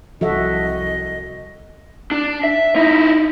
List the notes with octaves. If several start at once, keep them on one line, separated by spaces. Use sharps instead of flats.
C2 F3 F#4 A4 D#5 E5
D4
E5
D#4 E4